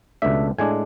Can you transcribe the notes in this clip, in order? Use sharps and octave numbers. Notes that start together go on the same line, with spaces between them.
C#2 B2 A3 D4 E5
A2 G#3 D4 G#5